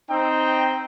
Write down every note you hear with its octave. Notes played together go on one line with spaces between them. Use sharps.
C4 D#4 G5